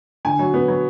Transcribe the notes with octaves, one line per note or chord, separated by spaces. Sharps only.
D3 G#5
F#3
B3
F#3